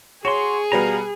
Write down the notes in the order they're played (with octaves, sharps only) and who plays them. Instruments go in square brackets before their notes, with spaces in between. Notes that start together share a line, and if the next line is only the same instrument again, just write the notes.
[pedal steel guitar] F#4 C6 [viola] G#4 [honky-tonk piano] C#5
[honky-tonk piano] B2 G3 B3 [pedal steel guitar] F5 A#5